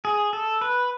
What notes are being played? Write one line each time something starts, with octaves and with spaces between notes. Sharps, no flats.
G#4
A4
B4